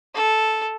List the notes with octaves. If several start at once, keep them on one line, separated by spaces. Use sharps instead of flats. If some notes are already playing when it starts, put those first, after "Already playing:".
A4